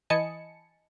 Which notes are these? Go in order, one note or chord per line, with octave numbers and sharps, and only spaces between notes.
E3 D#5 G#5 A5 B5 C#7